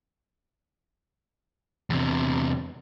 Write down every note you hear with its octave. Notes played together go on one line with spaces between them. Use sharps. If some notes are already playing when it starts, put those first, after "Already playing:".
E2 C3